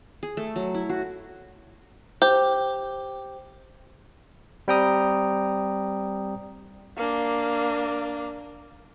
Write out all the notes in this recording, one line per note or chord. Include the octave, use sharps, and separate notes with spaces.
G#4
A3
F#3
E4
F#4
G4 C5
G3 C4 G5 A#5 D#6
A#3 D4